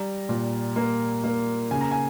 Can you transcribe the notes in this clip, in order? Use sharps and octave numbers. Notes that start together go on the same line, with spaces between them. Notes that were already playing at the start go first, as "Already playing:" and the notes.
Already playing: G3 A#5
A#2
A#3
A#3
C#3 G#5
A#5
G#5